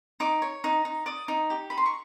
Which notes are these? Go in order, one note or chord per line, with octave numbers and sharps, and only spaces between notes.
D#4 D6
C#5
D#4
D#4
D5 D#6
D#4
G4
D#4 B5
C6
C#6